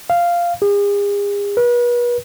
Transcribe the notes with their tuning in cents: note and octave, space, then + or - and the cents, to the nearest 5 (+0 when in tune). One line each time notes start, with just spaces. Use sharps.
F5 -5
G#4 -40
B4 -40